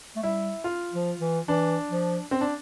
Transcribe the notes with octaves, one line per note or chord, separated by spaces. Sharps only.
A3
G3 E4
F4
F3
E3
E3 D4
F3
C4
D4